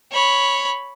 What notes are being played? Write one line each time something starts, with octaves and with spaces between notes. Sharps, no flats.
C#5 B5